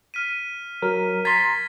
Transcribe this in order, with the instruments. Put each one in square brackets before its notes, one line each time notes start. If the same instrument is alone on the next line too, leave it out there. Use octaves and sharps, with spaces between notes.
[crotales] F6 B6 D#7
[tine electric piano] F#3 A#4
[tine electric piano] A#5 C6 [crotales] G#6 A6 B6